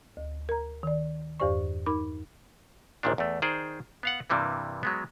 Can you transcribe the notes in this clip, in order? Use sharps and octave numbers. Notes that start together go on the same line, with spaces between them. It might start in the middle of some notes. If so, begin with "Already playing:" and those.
D2
A#4 A#5
D#3 D5
E2 G2 G4 C5 D5 C#6
D#4 A#4 B5 D6
A#1 D#2 A#2 D#3 D4
E2 A3
D#3 G#4 C5 D5
B3 F5 F#5
G2 C3 E3 G3 A#3
F#3 G#3 B3